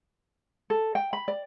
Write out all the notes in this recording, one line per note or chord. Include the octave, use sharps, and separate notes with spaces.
A4
G5
B5
D5